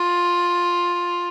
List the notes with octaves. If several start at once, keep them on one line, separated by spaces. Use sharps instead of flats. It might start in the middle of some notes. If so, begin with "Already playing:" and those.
Already playing: F4